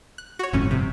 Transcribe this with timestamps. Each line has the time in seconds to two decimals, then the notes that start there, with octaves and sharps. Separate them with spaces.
0.18 F#6
0.39 F#4 C#5
0.53 G1 F2 A2 C#4
0.71 C3